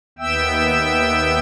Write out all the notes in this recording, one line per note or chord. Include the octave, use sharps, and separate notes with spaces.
D#2 B3 E5 G5 E6